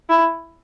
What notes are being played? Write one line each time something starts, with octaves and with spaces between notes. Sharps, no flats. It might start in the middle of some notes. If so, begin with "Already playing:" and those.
E4